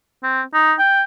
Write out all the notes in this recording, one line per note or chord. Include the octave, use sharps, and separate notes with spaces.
C4
D#4
G5